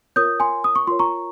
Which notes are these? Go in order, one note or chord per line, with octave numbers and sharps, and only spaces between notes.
F4 A#4 C#5 D#6 G6
G#5 C6
D#6
C#6
F4 A#4 C#5 C6
A#5 C#6